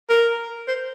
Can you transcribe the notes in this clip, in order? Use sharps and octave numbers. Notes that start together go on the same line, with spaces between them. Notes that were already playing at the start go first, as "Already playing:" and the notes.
A#4
C5